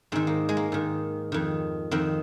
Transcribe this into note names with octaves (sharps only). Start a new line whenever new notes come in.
G#2 D#3 C4
A#3
G#3
A#3
G#2 D#3
F2 D#3
F2 D#3 C4